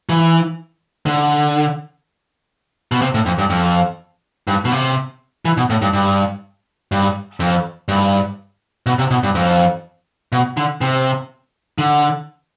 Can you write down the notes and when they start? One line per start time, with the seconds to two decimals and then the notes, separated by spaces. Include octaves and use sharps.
0.09 E3
1.06 D3
2.92 B2
3.01 C3
3.14 A2
3.26 F2
3.38 G2
3.50 F2
4.47 G2
4.65 B2
4.72 C3
5.45 E3
5.57 B2
5.70 A2
5.82 G2
5.93 G2
6.92 G2
7.40 F2
7.88 G2
8.86 B2
8.99 C3
9.10 B2
9.23 G2
9.35 F2
10.32 B2
10.57 D3
10.81 C3
11.78 D3